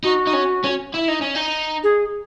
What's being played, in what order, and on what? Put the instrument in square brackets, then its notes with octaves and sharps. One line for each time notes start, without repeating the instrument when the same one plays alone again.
[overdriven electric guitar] D#4 [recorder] F#4
[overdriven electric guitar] D#4
C#4
C#4
E4
D#4
C#4
D#4
[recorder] G#4